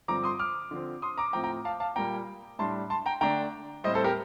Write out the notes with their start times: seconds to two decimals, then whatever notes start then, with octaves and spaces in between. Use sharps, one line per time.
0.08 G2 D3 F3 C4 A#5 D6
0.24 C6 D#6
0.39 D6 F6
0.71 D3 F3 C4
1.02 C6 D#6
1.18 A#5 D6
1.33 A2 F3 A3 C4 G5 A#5
1.44 G5 A#5
1.65 F5 A5
1.80 F5 A5
1.96 A#2 G3 A#3 G5 A#5
2.59 A2 G3 D4 A5 C6
2.90 A5 C6
3.06 G5 A#5
3.21 D3 A3 D4 G5 A#5
3.84 A2 G3 C4 C5 D#5
3.94 A4 C5
4.04 G4 A#4